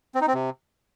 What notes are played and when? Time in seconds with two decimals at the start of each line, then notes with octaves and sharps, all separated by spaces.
0.15 C4
0.21 D#4
0.27 C4
0.34 C3